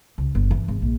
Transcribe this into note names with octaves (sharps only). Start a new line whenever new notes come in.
C#2
G1
E3
G#1
A#1